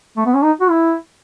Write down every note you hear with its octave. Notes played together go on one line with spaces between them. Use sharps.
A3
B3
C#4
D#4
F#4
E4